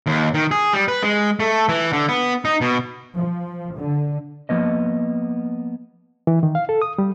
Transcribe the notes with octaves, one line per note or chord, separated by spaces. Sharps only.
D#2
D#3
G#4
G3
B4
G#3
A3
E3
D3
B3
D#4
B2
F3
D3
F3 A#3 B3 D#5
E3
D#3
F5
A4
D#6
G3